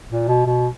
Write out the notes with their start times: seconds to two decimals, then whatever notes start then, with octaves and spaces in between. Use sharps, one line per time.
0.10 A#2
0.28 B2
0.46 B2